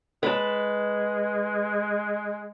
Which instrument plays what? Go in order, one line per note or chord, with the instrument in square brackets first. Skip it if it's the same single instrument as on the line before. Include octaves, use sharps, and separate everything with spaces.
[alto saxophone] G#3 [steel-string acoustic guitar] B4 A5